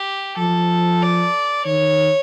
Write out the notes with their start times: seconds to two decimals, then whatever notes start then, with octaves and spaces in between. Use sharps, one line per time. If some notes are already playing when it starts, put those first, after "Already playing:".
Already playing: G4
0.37 F3 A4
1.02 D5
1.66 D#3 C#5